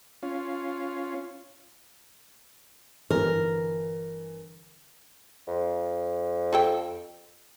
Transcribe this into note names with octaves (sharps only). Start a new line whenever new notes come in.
C#4 F4
G1 E3 A#4
F2
F4 A4 G5